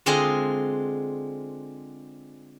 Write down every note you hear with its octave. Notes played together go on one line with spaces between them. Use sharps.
D3 G#3 C4 F4 G#4 D#5